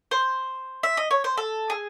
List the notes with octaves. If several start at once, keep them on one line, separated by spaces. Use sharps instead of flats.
C5
E5
D#5
C#5
C5
A4
G#4